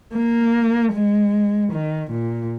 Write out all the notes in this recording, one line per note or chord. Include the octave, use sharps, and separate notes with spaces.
A#3
G#3
D#3
A#2